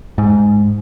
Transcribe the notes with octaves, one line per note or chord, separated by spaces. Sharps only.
G#2